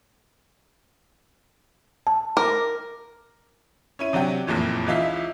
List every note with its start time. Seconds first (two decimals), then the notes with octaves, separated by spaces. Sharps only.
2.07 A5
2.37 A#4 D6
3.99 C#4 E4 D#7
4.13 C3 F#3 D4 F#4 G4
4.47 F#1 F2 A#2 E3
4.87 C#2 E3 D#4 F4 E5 B6